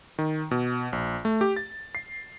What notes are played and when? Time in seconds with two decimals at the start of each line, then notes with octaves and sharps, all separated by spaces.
0.19 D#3
0.51 B2
0.93 A#1
1.25 A3
1.41 G4
1.56 A6
1.95 C7